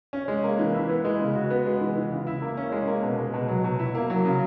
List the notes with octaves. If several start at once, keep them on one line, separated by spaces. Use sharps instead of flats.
C#4
G#3
A#3
E3
E4
B3
G#3
C#3
F#4
B3
G#3
E3
E3
C#3
E4
A#3
C#4
G#3
A#3
B2
G#3
B2
F#3
B2
E4
A#3
F#3
C#3